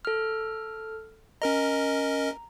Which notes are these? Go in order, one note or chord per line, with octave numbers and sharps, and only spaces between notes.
A4 F6
C#4 A#4 D#5 A#5